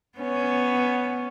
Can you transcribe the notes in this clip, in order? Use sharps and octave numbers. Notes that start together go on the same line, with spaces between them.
B3 C#4